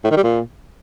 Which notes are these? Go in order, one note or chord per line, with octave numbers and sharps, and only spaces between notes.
A2
D#3
G3
A#2